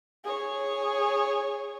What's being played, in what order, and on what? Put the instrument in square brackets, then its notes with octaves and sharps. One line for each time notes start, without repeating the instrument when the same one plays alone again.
[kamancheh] G#4 C#5